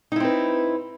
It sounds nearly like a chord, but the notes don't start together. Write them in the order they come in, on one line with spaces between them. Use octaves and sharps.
D#4 E4 C4 B4